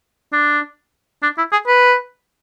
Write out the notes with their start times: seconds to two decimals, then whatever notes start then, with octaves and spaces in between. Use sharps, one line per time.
0.33 D4
1.23 D4
1.38 E4
1.52 G#4
1.67 B4